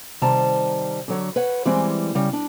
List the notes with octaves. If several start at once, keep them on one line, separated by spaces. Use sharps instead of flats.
C3 D#3 G3 C5 A5 A#5
D3 F#3 C#5
B4 C#5 F#5
E3 G3 G#3 C4
C#3 G3
D4